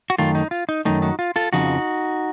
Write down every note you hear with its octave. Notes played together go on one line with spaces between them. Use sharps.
F#4
F#2 D#3 A3 F4
D#4
F4
D#4
F#2 D#3 A3 D#4
D#4 F#4
F4
F4 A4
F2 C#3 F3 D#4 F#4